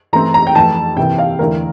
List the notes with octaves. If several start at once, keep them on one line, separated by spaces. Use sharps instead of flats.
E3 A3 C4 A#5
A#5
G5
F2 E3 A3 A5
C3 E3 A#3 E4 G5
F5
E2 D3 A3 E4 A#4